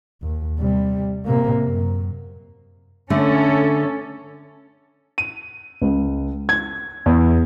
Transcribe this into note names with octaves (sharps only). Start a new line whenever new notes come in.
D#2
C3 G3
C3 A#3
F#2
D3 A3 C#4 A4
D#7
C#2
G#6
E2